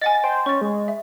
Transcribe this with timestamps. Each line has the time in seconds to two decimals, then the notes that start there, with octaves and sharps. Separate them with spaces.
0.01 D#5 F#5 G#5 A6
0.24 C5 G5
0.46 C#4 C#6 A6
0.61 G#3
0.88 E5